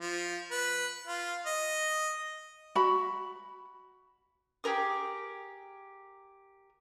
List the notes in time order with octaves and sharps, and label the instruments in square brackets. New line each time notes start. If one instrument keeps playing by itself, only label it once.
[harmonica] F3
B4
F4
D#5
[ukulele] F#4 B5
[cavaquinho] G4 G#4 A#4 D#6